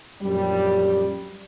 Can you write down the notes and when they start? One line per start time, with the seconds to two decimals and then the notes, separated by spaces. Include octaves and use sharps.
0.21 A#1 F#2 G3